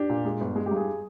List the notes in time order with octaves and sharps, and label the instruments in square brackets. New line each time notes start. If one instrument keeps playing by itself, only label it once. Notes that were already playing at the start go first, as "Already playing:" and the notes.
Already playing: [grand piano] D4 G4
[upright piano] A#2
G#3
G1
G#3
[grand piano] G4
[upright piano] G2
[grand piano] G#4